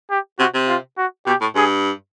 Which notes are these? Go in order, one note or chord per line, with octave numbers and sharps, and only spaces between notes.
G4
C3 F#4
C3
F4
F#4
B2 G4
A2
G2 G#4